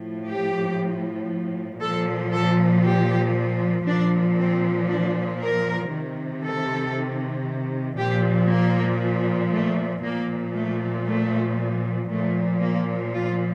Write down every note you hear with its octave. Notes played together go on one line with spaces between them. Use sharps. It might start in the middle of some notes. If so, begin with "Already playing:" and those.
Already playing: A2 F3
G4
A#2 F3 A4
A4
G4
A#2 F3 D4
C4
D4
A#4
C3 D#3
A4
A#2 F3 G4
A#3
A3
A#2 F3 A#3
A3
A3
A#2 F3 A3
A#3
F4